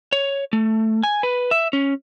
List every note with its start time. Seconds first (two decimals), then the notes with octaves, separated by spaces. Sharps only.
0.13 C#5
0.53 A3
1.03 G#5
1.23 B4
1.51 E5
1.73 C#4